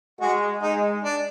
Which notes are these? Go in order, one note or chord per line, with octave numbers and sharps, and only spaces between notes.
G#3 F#4
G#3 D#4
D4